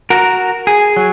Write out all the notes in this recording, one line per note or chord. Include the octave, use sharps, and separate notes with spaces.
F#4 A#4
G#4
F#3